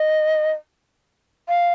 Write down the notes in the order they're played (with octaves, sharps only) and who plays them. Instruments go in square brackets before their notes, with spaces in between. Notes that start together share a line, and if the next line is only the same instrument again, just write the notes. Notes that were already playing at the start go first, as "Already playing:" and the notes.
Already playing: [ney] D#5
F5